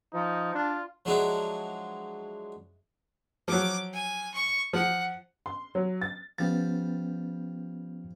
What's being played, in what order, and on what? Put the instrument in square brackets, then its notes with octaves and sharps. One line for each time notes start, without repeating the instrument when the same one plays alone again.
[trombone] F3 [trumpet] D#4
[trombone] D4 [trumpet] F4
[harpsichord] F3 F#3 G#3 D4 E4
[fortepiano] F3 F#3 [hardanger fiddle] D6
[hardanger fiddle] G#5
C#6
[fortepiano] F3 [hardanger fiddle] F#5
[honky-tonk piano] C6
F#3
A6
[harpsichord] F3 G3 [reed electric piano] B3 C#4 A6